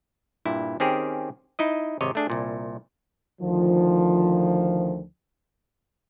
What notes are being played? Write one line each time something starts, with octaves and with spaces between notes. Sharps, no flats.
G2 A#2 E4
D#3 C4 C#4 G4 G#4 A#4
D#4 E4 D#5
G#1 C3 C#5 D#5
A3 D4 G#4
C2 A#2
D2 D#3 F3